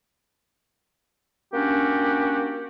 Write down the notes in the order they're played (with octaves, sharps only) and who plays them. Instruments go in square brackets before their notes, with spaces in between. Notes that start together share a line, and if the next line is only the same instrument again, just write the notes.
[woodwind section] A#3 C#4 D4 F#4 G4